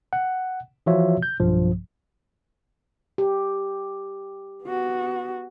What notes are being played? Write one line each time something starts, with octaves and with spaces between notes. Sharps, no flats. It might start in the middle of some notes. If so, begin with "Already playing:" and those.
F#5
E3 F3 F4 F#4 C#5 E5
G6
B1 G2 F3
G4
B3 F#4